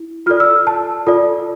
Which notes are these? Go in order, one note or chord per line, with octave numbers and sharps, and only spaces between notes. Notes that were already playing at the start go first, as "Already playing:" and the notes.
Already playing: E4
F4 A4 D5 F6
E6
A5
F4 A4 D5